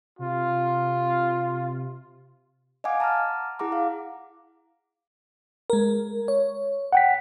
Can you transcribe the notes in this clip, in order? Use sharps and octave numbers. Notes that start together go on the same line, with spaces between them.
C3 F4
D#5 F5 F#5 G#5 D6
A5 A#5 D6 F6
E4 G#4 F#5 A#5 D6
F5
G#3 A#4
C#5
F#5 G5 B6